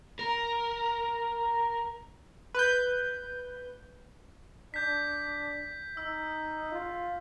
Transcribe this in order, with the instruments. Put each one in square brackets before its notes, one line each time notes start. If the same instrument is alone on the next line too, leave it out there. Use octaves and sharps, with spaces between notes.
[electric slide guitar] A#4 [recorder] A#5
[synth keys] B4 G6
[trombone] D4 [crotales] G6 B6
[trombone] D#4 [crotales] E6
[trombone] F4